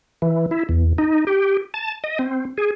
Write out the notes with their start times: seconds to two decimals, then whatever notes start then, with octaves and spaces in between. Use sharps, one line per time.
0.22 E3
0.51 E4
0.69 E2
0.98 D#4
1.27 G4
1.74 A5
2.04 D#5
2.19 C4
2.58 G#4